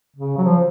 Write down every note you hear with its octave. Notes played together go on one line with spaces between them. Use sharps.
C#3
F#3
F3